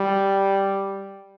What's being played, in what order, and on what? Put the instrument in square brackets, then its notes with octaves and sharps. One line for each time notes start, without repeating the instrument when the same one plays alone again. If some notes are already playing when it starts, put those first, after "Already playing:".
Already playing: [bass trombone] G3